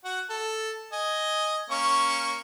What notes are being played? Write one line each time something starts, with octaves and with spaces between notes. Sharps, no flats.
F#4 F#5
A4
D#5 G#5
A#3 C#4 C#6